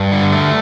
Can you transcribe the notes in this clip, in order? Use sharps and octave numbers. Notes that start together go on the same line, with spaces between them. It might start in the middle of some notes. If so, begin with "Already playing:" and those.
Already playing: G2
D3
A3